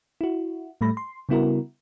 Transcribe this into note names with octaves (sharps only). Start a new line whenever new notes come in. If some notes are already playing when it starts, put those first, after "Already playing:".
E4 F#4
A2 G3 A3 B5 A#6
C6
C#3 G3 B3 E4 F#4 A#4